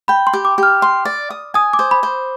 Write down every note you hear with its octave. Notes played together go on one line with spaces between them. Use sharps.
G5 B5
C6
G4
D6
G4 F6
C6
D5
D#6
G#5 D#6
D6
C5
B5
C5